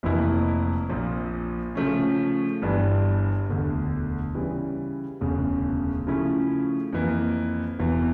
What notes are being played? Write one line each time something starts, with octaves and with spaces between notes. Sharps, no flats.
F1 F2 E3 A#3 E4
A#1 A#2 F3
C#3 F3 A3 C#4
G1 G2 E3 G3 D4
E1 D2 D3
C#3 E3 G3
E1 D2 C#3
C#3 F3 A3 C#4 E4
F2 E3 A#3
E1 E2 E3